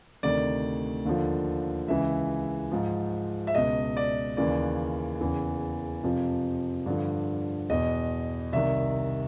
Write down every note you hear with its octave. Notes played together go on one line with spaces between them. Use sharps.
D2 C3 D#3 D5
D#2 D3 F3
C#2 C#3 E3 E5
G#2 F3
E5
C#2 B2 D#5
D5
D#2 C#3 E3 D5
E2 C#3 E3
F2 C3 F3
G2 D3 F3
E2 B2 D#5
C2 C3 D#3 E5